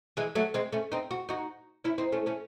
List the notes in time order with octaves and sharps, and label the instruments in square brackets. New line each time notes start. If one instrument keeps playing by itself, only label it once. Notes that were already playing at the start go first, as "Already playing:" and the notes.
[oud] E3 G#3
F#3 A3
G#3 C4
A3 C#4
C4 D#4
F#4
D#4 F#4
C#4 E4
C4 D#4
A3 C#4
A3 C#4